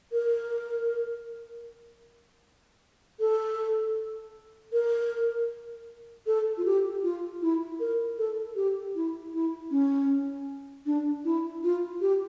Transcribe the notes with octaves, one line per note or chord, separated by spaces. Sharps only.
A#4
A4
A#4
A4
F4
G4
F4
E4
A#4
A4
G4
E4
E4
C#4
D4
E4
F4
G4